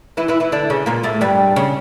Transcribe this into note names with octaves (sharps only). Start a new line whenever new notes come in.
E3 E4
E3 E4
E3 E4
D3 D4
C#3 C#4
A#2 A#3
A2 A3
G2 G3
C#3 C#4